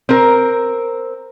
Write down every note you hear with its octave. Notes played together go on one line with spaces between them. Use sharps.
C4 A#4